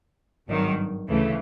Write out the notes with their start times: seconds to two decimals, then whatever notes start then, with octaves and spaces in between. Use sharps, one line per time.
0.47 G#1 G2 D#3 F#3
1.08 D2 C#3 E3 A3